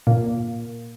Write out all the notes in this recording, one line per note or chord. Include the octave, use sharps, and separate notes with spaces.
A#2 A#3